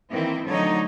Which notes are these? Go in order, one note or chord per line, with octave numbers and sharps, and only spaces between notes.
D#3 E3 A#3 C4 E4
D3 F3 F#3 A3 D#4 C#5